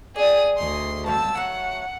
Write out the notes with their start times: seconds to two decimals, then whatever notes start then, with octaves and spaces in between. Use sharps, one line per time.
0.16 G#4 D5 G5 D#6
0.58 D2 D#4 G#4 C6
1.06 B2 F5 G5 A5 E6
1.36 F#3 A3 F#5